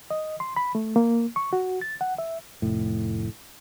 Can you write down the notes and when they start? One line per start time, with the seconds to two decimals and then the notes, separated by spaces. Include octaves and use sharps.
0.10 D#5
0.40 C6
0.56 B5
0.75 A3
0.96 A#3
1.36 C#6
1.53 F#4
1.81 A6
2.01 F#5
2.18 E5
2.62 F1 A2